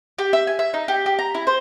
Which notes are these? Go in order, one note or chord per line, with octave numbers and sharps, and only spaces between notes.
G4
E5
G#5
E5
D#4
G4
G4
A#5
E4
C5